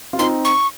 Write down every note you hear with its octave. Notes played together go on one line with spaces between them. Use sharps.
F4
C4 D#4 C6
C#6